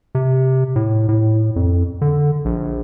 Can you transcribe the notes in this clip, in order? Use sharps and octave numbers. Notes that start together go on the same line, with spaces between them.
C3
A2
A2
F2
D3
A#1